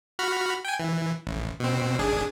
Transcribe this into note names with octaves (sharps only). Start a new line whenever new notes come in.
F#4 B5 F6
G5 G#5
E3
A1
B2 C4
G#1 D4 G#4